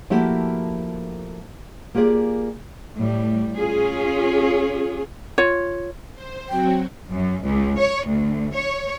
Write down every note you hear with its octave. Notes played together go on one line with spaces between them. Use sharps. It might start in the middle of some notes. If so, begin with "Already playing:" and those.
F3 A3 A#3 E4 F#4 G4
A#3 F4 G4 G#4 D5
A2 G3
C#4 F4 G#4
F4 C#5
C5
F#3 C4 F#4 G5
F#2
C#2
C#5
D2
C#5